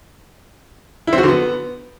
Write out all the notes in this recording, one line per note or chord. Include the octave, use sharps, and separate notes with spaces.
E4
C4
F#4
D3
B3